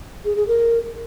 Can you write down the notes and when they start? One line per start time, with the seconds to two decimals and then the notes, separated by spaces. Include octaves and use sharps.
0.25 G#4
0.36 G#4
0.48 A#4